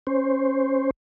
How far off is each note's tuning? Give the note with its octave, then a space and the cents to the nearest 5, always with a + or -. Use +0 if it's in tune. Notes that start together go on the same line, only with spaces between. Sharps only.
C#4 -15 C5 +0